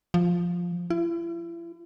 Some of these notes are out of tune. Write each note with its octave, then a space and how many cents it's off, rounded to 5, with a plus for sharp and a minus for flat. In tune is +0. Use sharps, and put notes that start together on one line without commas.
F3 +5
E4 +40